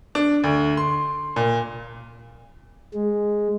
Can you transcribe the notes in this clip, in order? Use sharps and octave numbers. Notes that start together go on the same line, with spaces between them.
D4
D2
C6
A#2
G#3